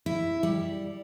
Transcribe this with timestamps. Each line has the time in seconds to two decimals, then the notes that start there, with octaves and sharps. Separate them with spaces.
0.06 E4
0.43 G3